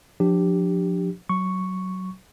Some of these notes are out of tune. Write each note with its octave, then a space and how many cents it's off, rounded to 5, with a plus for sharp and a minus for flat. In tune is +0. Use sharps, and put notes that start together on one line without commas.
F3 +25 D4 +15 G4 +0
F#3 +15 C#6 +0